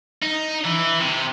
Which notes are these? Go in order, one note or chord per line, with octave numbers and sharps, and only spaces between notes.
D#4
E3
C3